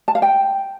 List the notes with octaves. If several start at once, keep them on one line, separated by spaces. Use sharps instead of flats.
A5
F5
G5